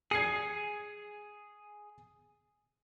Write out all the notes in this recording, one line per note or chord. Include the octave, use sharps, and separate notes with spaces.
G#4 G#6 C7 C#7